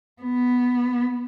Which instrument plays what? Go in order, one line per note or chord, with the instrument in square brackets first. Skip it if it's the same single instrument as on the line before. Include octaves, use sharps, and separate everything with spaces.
[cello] B3